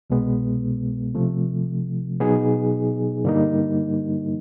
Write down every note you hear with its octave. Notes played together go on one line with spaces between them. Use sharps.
C2 B2 G#3 B3
C3 F3 A3
B2 F#3 B3 D#4 G#4
G2 D3 G3 A#3 D#4